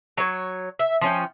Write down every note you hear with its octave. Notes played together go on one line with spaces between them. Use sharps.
F#3 C#5
E5
F3 C#4 G5